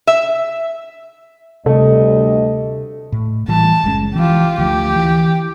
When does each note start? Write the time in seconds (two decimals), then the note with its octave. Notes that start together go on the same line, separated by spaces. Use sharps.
0.07 E5
1.66 D2 C3 G3 A3 D#5
3.12 A2
3.48 A2 E3 G3 A5
3.84 F#1 G#3 C#4
4.16 E3 F3 F4 G4
4.58 D2 F3 G4
4.96 E3